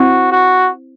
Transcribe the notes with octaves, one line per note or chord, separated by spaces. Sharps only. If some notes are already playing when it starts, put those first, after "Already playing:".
Already playing: C4 E4 F#4
F#4